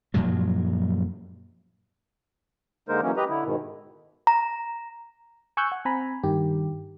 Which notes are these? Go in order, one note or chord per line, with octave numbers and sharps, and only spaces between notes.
F#2 A#2 F3 F#3
D3 G#3 A#3 D#4 A#4 C5
E3 F#3 A#3 C#4
G4 B4 D#5 A#5
D3 E4
G#2 B2 D#3
A#5
G#5 C#6 E6 F#6 G6
F#5
C4 G#5 A#5 B5
G2 D#3 G4